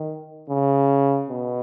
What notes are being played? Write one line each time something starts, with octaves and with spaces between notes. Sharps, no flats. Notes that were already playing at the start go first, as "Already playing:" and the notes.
Already playing: D#3
C#3
B2